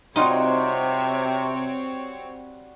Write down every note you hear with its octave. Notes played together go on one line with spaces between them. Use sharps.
C3 G3 C4 D#4 F4 F#4 C#5 C6